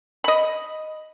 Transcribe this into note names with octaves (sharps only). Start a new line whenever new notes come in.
D#5 B5